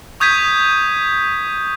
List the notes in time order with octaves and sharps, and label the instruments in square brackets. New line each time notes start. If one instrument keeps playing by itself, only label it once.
[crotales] C#6 D#6 G6 G#6 B6 D#7